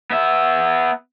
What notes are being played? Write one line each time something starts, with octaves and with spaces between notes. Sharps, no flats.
B3 E5